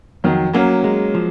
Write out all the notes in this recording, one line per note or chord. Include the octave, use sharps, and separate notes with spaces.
F2 D#3 F#3
F#3 A#3 C#4
G#3
F3